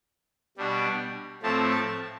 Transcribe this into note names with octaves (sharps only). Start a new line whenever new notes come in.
B2 G3 D4
A2 F3 A3 C4 A5
A5